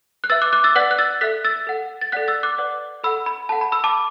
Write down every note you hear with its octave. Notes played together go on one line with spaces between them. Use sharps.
F#6
B4 E5 E6 A6
D6 F#6
D6 F#6
E6 A6
B4 D5 F#5 F#6 B6
F#6
E6 A6
A4 E5 F#6 B6
E6 A6
A4 F#5
A6
A4 D5 F#5 F#6 B6
E6 A6
D6 F#6
B4 D5 F#5
A4 F#5 B5 E6
B5
A4 F#5 A5
B5
B5 E6
A5 D6